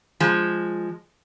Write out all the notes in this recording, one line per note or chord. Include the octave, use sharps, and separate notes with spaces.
F3 G#3